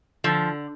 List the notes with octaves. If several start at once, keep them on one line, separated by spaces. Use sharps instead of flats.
D3 F3